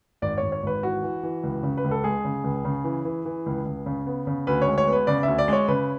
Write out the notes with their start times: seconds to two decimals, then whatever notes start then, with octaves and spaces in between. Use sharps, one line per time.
0.22 G#1 D5
0.38 G#1 C#5
0.52 C#5
0.63 G#1 B4
0.83 E3 F#4
1.03 E3
1.23 E3
1.43 C#2
1.63 C#3
1.78 B4
1.84 C#2
1.91 A4
2.04 G#3 G#4
2.25 C#3
2.44 C#2
2.65 C#3
2.84 E3
3.05 E3
3.25 E3
3.46 C#2
3.65 C#2
3.86 C#3
4.07 B3
4.27 C#3
4.47 D2 B4
4.62 C#5
4.67 G#3
4.78 C#5
4.87 B3
4.93 B4
5.07 C#3 D5
5.23 D2 E5
5.38 D5
5.48 G#3 C#5
5.68 C#3 B4